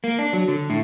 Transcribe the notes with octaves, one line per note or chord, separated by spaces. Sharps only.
A#3
D4
F#3
D3
A2